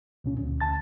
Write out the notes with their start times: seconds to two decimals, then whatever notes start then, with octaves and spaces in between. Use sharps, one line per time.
0.24 C#2 A#2 C#4
0.38 D2
0.61 D2 A5 A6